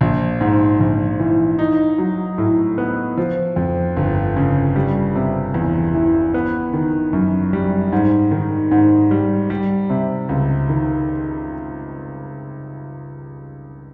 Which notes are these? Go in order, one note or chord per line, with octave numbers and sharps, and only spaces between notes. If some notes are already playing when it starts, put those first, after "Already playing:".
A#1
G#2
A#1
E3
D#4
F#3
A2
B3
F3
F2
G1
C#3
G3
C3
E2
E3
B3
D#3
F#2
G3
G#2
D#3
G#2
G3
G3
C3
C#2
D#3